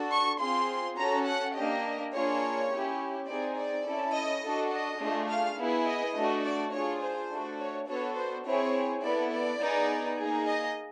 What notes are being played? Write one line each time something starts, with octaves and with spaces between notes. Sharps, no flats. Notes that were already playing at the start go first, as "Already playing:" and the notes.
Already playing: D4 F#4 A4
C#6
C4 F4 G#4 C6
C#4 F#4 A4 A#5
F#5
A#3 D4 G4 D#5
A#3 D4 F4 G#4 C#5
C#4 E4 G4
C4 D#4 G#4 D5
D5
C#4 E4 A4
D#5
D4 F#4 A4
D#5
A3 D4 F4 G#4
F5
B3 E4 G#4
D#5
A3 D4 F#4 A4
D5
D4 F4 G#4 C#5
C5
A3 D4 F#4 A4
C#5
B3 D4 F#4 A4 C#5
C5
C4 E4 G#4 C#5
B3 E4 A4 D5
D5
B3 D#4 G#4
A#3 D#4 G#4
D#5